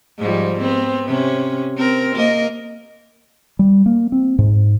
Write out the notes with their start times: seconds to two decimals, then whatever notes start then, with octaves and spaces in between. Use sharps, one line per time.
0.18 G#2 F3 G3
0.60 B3 C4
1.08 C3 C#4
1.77 C4 A#4
2.15 A#3 A#4 D#5
3.59 G3
3.86 A#3
4.12 C4
4.39 G#2